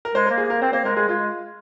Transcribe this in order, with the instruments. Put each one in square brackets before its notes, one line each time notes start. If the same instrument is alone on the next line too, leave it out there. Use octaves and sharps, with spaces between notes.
[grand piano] A#4
[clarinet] G#3 [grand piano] C5
[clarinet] A#3 [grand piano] A#4
[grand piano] G#4
[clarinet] A#3 [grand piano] A#4
[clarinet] C4 [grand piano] C5
[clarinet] A#3 [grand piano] C5
[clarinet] G#3 [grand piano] A#4
[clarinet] G#3 [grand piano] G#4
[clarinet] G#3 [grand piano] F4